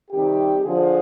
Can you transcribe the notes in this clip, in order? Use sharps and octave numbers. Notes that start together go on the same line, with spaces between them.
C3 D#3 G3 G4
D3 F3 G#4